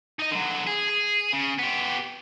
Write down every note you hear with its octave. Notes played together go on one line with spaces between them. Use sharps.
D#4 D#5
D3 F#3
G#4
G#4
C#3
B3 G4